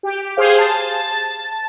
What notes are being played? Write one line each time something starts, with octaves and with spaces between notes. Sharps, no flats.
G4
G#4 C5 F5
A5 A6